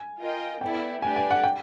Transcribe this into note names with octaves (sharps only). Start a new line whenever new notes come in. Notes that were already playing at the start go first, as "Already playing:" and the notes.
Already playing: G#5
F4 A#4 D#5 G5
B3 E4 A4 D5 G5
A3 D4 G4 B4 D5 G#5
G#5
F#5
G5